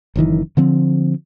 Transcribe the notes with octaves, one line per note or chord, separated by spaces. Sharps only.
F#1 F#2 D#3 E3
D3 F3 C4